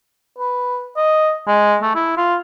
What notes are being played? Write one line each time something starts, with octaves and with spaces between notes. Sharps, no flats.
B4
D#5
G#3
A3
E4
F4